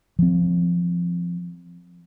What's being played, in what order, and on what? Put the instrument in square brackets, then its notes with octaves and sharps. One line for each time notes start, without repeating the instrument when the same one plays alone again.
[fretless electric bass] F3 C4